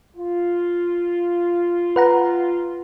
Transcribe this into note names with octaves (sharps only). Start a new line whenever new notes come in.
F4
B4 F#5 A#5